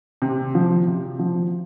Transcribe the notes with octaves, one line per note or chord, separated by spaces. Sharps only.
C3
F3
C3
F3